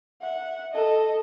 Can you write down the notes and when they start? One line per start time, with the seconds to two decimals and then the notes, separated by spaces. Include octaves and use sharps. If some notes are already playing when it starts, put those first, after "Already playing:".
0.22 E5 F#5
0.72 A4 D#5